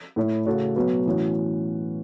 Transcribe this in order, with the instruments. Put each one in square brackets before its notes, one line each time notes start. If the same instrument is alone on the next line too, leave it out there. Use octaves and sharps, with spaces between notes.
[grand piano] A2 A3 E4 C#5
C#3 A3 F#4 A4 C#5
B2 F#3 B3 F#4 B4
A2 E3 C#4 F#4